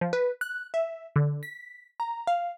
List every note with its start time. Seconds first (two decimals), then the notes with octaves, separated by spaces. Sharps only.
0.01 F3
0.13 B4
0.41 F#6
0.74 E5
1.16 D3
1.43 B6
2.00 A#5
2.27 F5